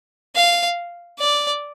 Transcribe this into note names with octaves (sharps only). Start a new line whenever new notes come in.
F5
D5